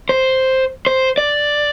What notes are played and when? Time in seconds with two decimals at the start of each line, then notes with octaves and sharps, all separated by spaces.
0.09 C5
0.87 C5
1.18 D5